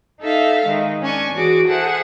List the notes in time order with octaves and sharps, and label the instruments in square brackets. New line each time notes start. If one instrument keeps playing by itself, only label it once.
[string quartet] D#4 A4 E5 F5
D#3 G#3
C#4 D4 G#5 C#6
E3 F#4 G#4 D6
G#4 A4 C5 E5 F#5